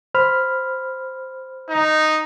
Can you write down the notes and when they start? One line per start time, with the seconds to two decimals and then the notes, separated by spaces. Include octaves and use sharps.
0.14 C5 B5 F6
1.69 D#4